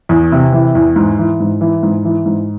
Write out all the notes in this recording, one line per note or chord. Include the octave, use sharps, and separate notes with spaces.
E2
C3
E3
E2
G#2
E3
G#2
E3
G#2
E3
G#2